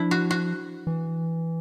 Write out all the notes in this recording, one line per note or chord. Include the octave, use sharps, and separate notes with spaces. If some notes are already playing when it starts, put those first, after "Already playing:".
Already playing: F3 D4 E4
F#4
F#4
E3